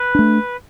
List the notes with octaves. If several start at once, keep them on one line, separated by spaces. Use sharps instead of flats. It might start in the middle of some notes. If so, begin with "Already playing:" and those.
Already playing: B4
A3 D4